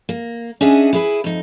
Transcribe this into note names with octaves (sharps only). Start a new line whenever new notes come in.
A#3
C#4 D4 G#4 D#5 E5 F#5
E4 G#4 B4
F2 D#4